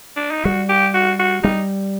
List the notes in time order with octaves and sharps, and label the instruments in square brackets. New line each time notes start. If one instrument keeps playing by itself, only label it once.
[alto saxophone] D4
D#4
[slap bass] G3 [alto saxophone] F#4
[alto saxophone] G4
F#4
F#4
[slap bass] G3 [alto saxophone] D#4